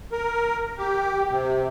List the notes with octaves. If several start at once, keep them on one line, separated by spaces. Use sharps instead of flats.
A#4
G4
C3